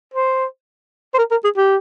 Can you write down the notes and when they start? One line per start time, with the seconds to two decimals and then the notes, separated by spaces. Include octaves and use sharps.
0.14 C5
1.14 C5
1.18 A#4
1.31 A#4
1.44 G#4
1.57 G4